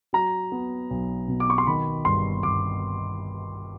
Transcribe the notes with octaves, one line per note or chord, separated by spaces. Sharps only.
F#3 A#5
B3
B1
B2
D6
C#6
C6
D#3 B5
G1 C6
G1 D6